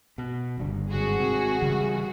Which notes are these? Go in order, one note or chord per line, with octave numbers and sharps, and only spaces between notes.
B2
F#1 G2 D3
G#1 F#4 G#4
C3
C#3 E3 G3